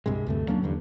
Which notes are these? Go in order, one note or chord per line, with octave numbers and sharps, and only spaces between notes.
C2 G2 C3 G#3
D2 G2 A3
F#3 A#3 C#4 D4
E2 G2 D3